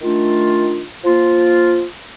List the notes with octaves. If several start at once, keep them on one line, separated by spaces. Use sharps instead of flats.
D#3 A3 D4 F4
F3 A#3 F4